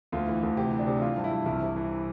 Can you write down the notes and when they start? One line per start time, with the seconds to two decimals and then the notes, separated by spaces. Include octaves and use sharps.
0.12 D2 F4
0.28 E3
0.43 D2
0.57 C3 G4
0.72 E3
0.79 D4
0.87 C3
1.02 E3 F4
1.17 G2
1.24 E4
1.31 G2
1.46 C2 E4
1.62 C3
1.76 E3